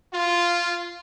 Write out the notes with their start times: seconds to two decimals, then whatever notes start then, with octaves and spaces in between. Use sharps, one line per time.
0.14 F4